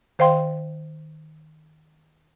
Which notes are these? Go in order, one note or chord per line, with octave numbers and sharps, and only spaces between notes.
D#3 C5 F5 G5 C6